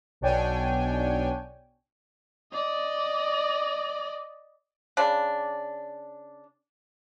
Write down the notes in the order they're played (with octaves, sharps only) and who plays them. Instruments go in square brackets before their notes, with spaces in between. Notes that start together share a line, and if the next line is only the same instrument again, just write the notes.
[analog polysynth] B1 B2 D4 C#5 G5 G#5
[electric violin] D5 D#5
[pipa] C#3 D4